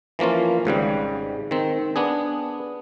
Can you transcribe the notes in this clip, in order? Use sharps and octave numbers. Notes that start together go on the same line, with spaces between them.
E3 F3 A#3 C#4 F4
G#1 G#2 C#3 G3
D#3 C4
B3 D4 G#4